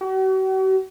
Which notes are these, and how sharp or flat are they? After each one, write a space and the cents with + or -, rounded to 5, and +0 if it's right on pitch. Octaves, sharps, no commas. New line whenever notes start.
F#4 +45